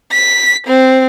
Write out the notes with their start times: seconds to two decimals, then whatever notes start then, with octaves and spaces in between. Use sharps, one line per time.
0.12 B6
0.67 C4